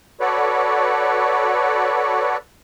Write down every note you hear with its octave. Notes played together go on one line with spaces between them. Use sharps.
F#4 A4 B4 C#5 D5